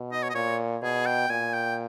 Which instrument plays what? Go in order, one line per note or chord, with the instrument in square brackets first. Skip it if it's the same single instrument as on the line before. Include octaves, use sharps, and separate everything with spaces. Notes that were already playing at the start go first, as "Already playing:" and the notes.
Already playing: [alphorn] B2
[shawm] D#5
C#5
D#5
[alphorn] A#2 [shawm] C#5
[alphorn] B2 [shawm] G#4
[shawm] G5
[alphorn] A#2 [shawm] G#5
[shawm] G5